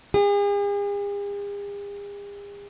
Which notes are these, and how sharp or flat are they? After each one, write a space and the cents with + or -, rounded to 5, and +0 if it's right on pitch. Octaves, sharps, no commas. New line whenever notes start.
G#4 -45